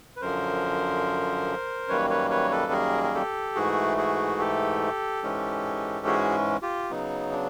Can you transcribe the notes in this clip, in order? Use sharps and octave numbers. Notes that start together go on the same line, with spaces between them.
B4
F#2 D3 F3 A#4 C5
F#2 D#3 G3 A#3 B4 C#5
B4 C#5
B4 C#5
A4 B4
G#4 A#4
A#4
G4 A4
G#2 E3 A3 F#4 G#4
F#4 G#4
G4 A4
G#2 E3 G#3 C#4
F#4 G#4
F4 G4
C#3 F#3 B3 D#4
D4